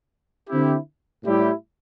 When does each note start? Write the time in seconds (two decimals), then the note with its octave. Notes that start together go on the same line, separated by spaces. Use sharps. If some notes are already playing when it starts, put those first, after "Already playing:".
0.49 D3 C4 E4 G4
1.24 A2 G3 E4 G4